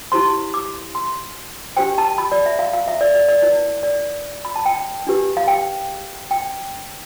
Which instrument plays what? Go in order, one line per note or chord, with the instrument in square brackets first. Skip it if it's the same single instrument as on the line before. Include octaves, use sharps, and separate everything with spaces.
[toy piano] E4 G4 C5 C6
D6
C6
D4 G4 C5 G5
A5
B5
D5
E5
F5
F5
E5
D5
D5
D5
E4 B4 D5
D5
B5
A5
G5
D4 G4 B4
F5
G5
G5